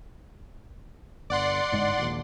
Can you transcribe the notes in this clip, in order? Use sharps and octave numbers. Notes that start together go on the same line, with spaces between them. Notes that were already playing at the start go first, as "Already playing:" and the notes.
G1 D5 F#5 C6
G1 G#2 G#3
A#1 D#2